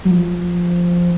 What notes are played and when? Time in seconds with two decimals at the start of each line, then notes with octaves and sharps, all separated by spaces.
0.05 F#3
0.11 F3